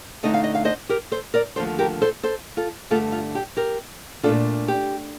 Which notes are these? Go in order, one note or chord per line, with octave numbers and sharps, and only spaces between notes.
D2 D3 A3 C4 D#4 D#5
F5
D#5
F5
C5 D#5
G4 A#4
A4 C5
A#4 D5
D#2 D3 F3 A3 A4 C5
G4 A#4
A4 C5
A4 C5
F4 A4
G2 D3 A3 F4 A4
F4
G4
G4 A#4
A#2 A3 D4 F4 A4
G4